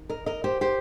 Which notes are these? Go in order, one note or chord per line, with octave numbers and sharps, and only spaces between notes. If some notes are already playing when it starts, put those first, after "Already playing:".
Already playing: D#3
A#4 D#5
A#4 D#5
G4 C5
G4 C5